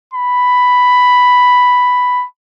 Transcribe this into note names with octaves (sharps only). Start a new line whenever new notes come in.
B5